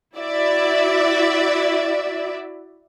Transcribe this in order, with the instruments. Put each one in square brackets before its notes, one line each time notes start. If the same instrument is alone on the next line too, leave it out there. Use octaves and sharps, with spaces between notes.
[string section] E4 F#4 D5 E5